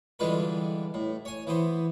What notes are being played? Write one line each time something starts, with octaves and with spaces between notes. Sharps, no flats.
D3 E3 G3 G#3 F4 B4
A2
C#5 G#5
E3 B3 C5